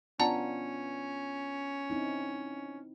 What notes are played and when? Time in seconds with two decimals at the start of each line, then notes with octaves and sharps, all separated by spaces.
0.20 B3 C#4 D4 F4 D5 F#5 A5 A#5
1.90 C4 D#4 E4